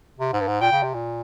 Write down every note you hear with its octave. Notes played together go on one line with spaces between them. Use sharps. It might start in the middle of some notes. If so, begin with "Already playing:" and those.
C3
G#2
G2
G#2
A#2 G5
C#3
C3
A#2